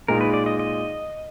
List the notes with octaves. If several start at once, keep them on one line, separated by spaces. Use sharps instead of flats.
A#2 G#3 D#4 A#4
B4
D5
D#5
D#5